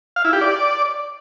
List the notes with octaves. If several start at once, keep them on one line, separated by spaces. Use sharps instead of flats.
F5
E4
G4
D5